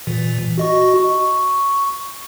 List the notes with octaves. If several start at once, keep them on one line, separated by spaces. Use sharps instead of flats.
A#2 E3
F#4 D#5 C#6
C#6